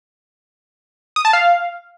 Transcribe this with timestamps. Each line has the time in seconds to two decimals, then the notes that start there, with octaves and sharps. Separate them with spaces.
1.16 D#6
1.25 A5
1.33 F5